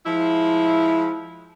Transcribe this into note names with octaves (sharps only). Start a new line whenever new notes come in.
F3 G#3 E4